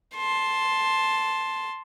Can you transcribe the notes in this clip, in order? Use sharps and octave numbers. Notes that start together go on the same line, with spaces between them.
A5 C6